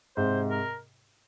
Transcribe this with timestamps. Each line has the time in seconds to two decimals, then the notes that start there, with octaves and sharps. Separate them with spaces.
0.17 G#2 C3 C5
0.50 A#4